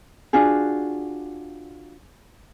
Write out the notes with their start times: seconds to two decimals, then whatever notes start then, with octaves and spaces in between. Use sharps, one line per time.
0.33 D4 F4 F#4 G#4